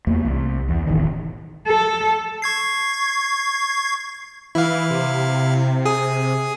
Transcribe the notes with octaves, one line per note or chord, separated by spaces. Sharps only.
E2 A3 A#3
C2
E2
E1 A1 D#3
A4
C#6 G#6 C7
E3 E4 F5
C3
G#4 D#6